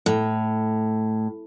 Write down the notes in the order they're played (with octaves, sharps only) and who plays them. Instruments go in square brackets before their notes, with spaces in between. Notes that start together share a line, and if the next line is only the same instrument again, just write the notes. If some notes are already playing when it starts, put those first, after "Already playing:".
[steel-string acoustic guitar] A2